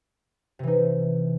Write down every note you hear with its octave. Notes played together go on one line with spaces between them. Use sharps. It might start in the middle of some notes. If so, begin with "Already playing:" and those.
C3 E3 D#4